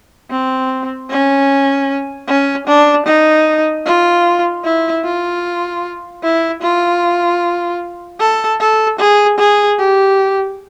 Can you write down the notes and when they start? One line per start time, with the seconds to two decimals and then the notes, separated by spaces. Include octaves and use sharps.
0.30 C4
1.10 C#4
2.28 C#4
2.67 D4
3.06 D#4
3.86 F4
4.64 E4
5.04 F4
6.23 E4
6.62 F4
8.20 A4
8.60 A4
8.99 G#4
9.39 G#4
9.78 G4